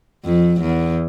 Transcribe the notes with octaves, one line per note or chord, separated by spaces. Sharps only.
F2
E2